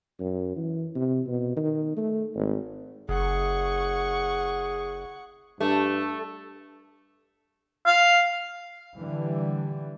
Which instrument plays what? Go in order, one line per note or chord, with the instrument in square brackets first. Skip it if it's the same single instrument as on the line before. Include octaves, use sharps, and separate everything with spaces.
[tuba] F#2
E3
C3
B2
D#3
A3
G#1
[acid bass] F#1 [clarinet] G#4 [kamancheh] F#5 C#6
[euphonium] G2 [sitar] A3 [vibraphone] D4 G4
[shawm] F5
[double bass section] D3 E3 G3